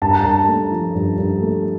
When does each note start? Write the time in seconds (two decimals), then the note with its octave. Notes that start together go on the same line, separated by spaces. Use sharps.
0.02 G2 A5
0.11 A#5
0.21 G2 A5
0.48 A3
0.71 F3
0.95 G2
1.18 G2
1.41 A3